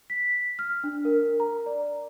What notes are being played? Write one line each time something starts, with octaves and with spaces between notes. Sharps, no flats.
B6
F6
D4
A#4
A#5
D5